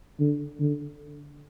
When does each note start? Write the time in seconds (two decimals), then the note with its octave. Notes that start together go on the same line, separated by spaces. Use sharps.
0.19 D3
0.60 D3